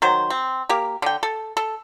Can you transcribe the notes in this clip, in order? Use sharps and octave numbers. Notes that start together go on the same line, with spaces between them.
D#3 F#3 C5
C4
A#3 G4 A#4
D3 G5
A4
A4